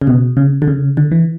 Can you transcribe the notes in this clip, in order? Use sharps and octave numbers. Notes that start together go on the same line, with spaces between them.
C#3
B2
C#3
D3
C#3
D3
E3